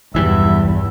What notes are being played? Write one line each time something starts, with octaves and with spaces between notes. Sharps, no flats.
B1 E2 G2 E3 G3 E5